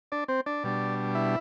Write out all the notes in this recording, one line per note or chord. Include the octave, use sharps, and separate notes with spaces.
D4 D5
C4 C5
D4 D5
B2 G3 D4
E4 E5